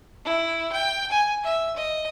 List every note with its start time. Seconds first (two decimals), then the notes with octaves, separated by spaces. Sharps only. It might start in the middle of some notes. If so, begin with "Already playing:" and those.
0.25 E4
0.72 G5
1.11 G#5
1.44 E5
1.77 D#5